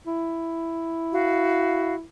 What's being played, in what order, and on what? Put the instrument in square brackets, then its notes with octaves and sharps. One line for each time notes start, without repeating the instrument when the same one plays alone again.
[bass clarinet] E4
[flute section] F#4 F5